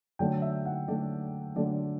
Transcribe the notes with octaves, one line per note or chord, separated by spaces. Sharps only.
D3 F#3 A3 D4 G5
E5
F#5
D3 F#3 A3 D4 D5
D3 F#3 A3 D4 D5